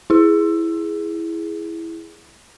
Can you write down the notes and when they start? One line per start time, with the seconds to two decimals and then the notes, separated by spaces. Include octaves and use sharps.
0.10 E4 G#4